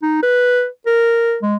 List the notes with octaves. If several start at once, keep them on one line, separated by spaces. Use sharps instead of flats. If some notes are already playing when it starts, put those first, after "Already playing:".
D#4
B4
A#4
G#3